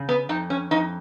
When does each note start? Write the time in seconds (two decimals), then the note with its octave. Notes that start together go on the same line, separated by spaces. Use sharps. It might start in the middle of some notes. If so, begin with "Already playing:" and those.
Already playing: C#3
0.09 B3
0.29 F2 D#4
0.50 C#4
0.71 F2 D#4